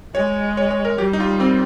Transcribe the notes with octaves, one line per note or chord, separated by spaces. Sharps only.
G#3 C#5
C#5
C#5
A#4
G3 G4
D#4
F4
C4